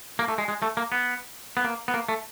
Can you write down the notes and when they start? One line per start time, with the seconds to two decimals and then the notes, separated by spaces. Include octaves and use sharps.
0.19 A#3
0.28 A3
0.38 G#3
0.48 G#3
0.62 A3
0.77 A#3
0.92 B3
1.57 B3
1.64 A#3
1.88 B3
1.94 A#3
2.09 A3